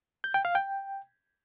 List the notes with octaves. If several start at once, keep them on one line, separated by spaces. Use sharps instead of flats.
G6
G5
F5
G5